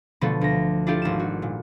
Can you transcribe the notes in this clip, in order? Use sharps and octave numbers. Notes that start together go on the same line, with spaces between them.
B2 D3 F3 A3 B3 A4
D2 A#6
D4 E4 F4 G4 A4
G#1 A3 E7
F#4
A#2